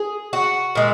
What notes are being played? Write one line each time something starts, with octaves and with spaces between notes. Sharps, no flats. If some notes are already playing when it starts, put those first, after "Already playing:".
Already playing: G#4
F#4
A#2 G#3